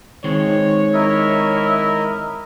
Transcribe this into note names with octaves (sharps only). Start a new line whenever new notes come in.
D#3 G#3 C4 C#5
E4 A#4 D#5 E5